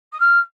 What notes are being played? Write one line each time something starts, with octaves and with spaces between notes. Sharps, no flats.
D#6
F6